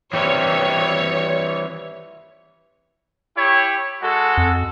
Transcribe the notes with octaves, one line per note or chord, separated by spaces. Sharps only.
E3 G3 C4 C#5
E4 G4 C#5
G#3 F#4 A4
F2